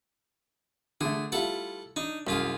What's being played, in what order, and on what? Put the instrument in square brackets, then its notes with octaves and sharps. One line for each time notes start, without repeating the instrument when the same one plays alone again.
[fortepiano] D3 A3 [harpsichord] G#4
[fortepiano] G3 E4 F4 [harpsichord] A4 F#5
[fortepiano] D4 [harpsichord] D#4
[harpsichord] C2 F4 G#4 [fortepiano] F#2